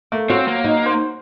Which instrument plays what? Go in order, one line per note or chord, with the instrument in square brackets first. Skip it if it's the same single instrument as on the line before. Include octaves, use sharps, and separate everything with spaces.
[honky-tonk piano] A3 [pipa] A#3
[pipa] F#3 F4 [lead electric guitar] C4 [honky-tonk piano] F#4 [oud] C#5
[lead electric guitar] A#3
[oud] D#4
[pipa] C5